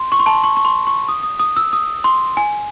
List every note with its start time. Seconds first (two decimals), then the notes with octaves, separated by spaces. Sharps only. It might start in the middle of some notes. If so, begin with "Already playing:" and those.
Already playing: C6
0.12 C#6
0.20 C6
0.26 A5
0.35 C6
0.44 C#6
0.57 C#6
0.65 C6
0.87 C#6
1.08 D#6
1.23 D#6
1.39 D#6
1.57 E6
1.73 D#6
2.04 C6
2.37 G#5